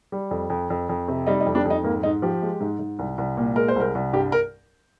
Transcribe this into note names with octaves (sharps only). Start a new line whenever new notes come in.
G3
F2
F2
F2
F2
C3
G3 D#4
D#4
F2
D4
F2
D#4
G#2 A#3
G#2 D#4
F3 G4
G#3
G#2
G#2
C2
C2
A#2
G#3 A#4
C5
C2 A#4
C2
G2 G4
A#4